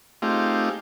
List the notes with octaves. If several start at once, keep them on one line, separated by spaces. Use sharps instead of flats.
A3 C4 D#4 F4 G4 G#4